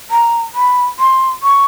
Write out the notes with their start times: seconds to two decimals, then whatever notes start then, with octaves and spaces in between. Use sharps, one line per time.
0.11 A#5
0.55 B5
0.99 C6
1.43 C#6